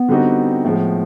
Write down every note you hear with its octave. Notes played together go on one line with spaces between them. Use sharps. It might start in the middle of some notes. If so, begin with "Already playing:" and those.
Already playing: B3
D3 G3 C4 D#4 F#4
A2 F3 G#3